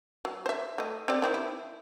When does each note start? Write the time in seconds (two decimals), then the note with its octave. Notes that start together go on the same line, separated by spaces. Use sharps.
0.25 F#3
0.46 C5 E5
0.78 A3 D#5
1.08 C4 G4 D5
1.22 D#3 C4 E4
1.34 E4